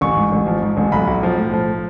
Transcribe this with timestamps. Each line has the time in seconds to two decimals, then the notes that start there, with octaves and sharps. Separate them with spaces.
0.01 A1 C#6
0.16 G#2
0.32 A1
0.47 F3
0.62 G#2
0.77 A1
0.92 B1 B5
1.07 B1
1.23 F3
1.38 A2
1.54 F3